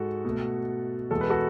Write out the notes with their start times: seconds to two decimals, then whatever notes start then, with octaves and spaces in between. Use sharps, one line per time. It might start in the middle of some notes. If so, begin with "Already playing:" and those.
Already playing: G#2 G#3 F#4 A4
0.25 B2 A3
1.11 E2 B2 G#3 A4
1.21 B4
1.30 F#4 A4